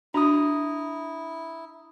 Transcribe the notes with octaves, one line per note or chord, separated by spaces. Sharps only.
D4 E4 F#4 A#5 D#6